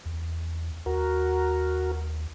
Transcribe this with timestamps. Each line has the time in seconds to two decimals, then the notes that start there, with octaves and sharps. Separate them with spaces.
0.05 E2
0.86 D#2 F#4 A#4